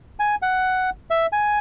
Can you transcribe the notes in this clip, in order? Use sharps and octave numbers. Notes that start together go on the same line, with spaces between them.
G#5
F#5
E5
G#5